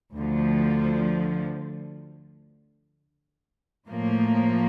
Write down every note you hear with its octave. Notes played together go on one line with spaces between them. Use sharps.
D2 D3 F3
A2 F3 A#3